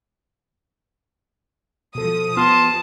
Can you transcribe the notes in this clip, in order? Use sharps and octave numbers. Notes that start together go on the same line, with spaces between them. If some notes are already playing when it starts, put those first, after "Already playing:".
B2 F3 A4 D#6
B3 F4 A5 C6 F6